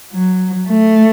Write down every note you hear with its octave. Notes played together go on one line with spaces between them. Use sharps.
F#3
A3